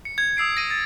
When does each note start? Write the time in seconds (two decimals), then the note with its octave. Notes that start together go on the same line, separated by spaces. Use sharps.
0.05 C#7
0.18 G#6
0.37 D#6 E6 C7 D7
0.57 A#6 D#7
0.70 A6